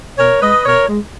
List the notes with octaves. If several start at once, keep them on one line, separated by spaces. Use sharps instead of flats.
B2 A#4 C#5
G#3 B4 D#5
B2 A#4 C#5
G#3